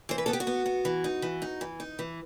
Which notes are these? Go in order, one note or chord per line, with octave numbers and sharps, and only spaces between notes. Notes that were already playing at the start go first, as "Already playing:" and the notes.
E3 C5
B4
B3 A4
G4
F#4
B3
B3
E3
D#4
E3
D#4
E3
D#4
E3